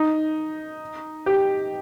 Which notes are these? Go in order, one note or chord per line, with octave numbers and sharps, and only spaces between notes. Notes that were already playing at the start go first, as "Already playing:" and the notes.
Already playing: D#4
G4